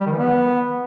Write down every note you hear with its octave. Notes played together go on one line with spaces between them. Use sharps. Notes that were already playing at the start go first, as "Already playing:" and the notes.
G3
D#3
E3
B3